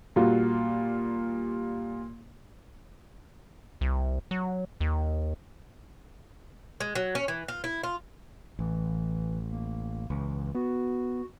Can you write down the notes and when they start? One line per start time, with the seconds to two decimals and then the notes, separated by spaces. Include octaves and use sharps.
0.16 A#2 G3 F4 F#4
3.81 C2
4.31 F#3
4.81 D#2
6.80 G#3
6.95 F#3
7.15 C#4
7.28 E3
7.48 F4
7.64 E4
7.83 F4
8.59 A1 E3
9.52 A#3
10.10 C#2 E3
10.55 B3 F#4